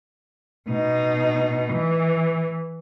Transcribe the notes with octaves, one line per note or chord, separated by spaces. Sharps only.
B2 D#4
E3